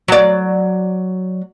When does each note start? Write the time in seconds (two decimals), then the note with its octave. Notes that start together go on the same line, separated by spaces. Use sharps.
0.08 F#3 D5